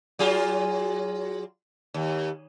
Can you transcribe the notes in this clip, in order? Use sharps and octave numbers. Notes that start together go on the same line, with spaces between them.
F#3 F4 G#4
D#2